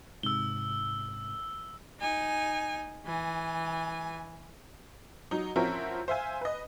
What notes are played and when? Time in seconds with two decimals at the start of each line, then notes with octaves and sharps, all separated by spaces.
0.23 G#2 C3 E6 G7
2.00 D#4 G#5
3.06 E3 G#5
5.31 F#3 D#4
5.56 F3 C4 C#4 E4 F#4 A#4
6.08 C5 E5 F5 G#5
6.41 B4 D#5